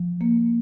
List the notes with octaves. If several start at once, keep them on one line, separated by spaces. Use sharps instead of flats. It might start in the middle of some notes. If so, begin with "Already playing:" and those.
Already playing: F3
A#3